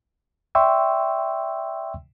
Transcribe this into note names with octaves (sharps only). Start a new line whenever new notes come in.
D5 E5 G5 C6 C#6 E6